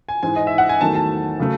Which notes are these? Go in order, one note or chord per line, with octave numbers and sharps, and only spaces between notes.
G#5
G#2 E3 G#3 G#5
D#5
E5
F#5
G#5
E2 D#3 F#3 A3 A5
A5
C#3 F#3 A3